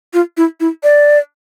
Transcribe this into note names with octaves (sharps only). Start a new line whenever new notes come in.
F4
E4
E4
D5